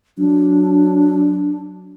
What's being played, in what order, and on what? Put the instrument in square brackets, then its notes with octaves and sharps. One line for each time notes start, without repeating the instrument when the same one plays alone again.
[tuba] F#3 [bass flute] D4